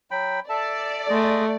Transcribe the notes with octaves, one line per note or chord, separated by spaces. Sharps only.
F#3 G5 B5
A4 D5 E5 A5
G#3 A3 G#4 D#5